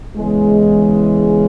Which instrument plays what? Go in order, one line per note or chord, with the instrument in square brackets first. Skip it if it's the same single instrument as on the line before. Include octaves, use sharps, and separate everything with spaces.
[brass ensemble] E2 C#3 E3 G#3